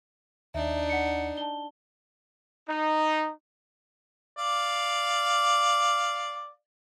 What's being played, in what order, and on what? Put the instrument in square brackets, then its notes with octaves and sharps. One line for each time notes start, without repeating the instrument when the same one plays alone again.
[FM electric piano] D#2 [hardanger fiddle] D4 D#4 [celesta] E5
[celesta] F#5 C#7
A5 G7
[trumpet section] D#4
[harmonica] D5 F5